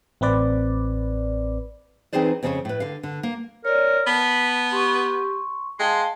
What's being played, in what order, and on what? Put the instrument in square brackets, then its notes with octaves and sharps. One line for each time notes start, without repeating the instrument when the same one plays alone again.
[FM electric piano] A1 C4 B4 D5
[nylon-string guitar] E3 C4 D#4 G#4 C5 D5
F2 C#3 C4 A4 C5 C#5
A2 B4
D3 F5
D3
A#3
[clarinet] A#4 [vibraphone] C#5 D5
[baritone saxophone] B3 [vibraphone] A5 [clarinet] B5
[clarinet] G4 [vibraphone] C6 C#6
[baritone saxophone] G#3 [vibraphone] F5 G5 A5 [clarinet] C6